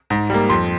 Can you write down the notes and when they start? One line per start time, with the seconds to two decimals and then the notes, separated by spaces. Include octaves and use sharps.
0.10 G#2
0.30 G3 A#3
0.50 F2 C6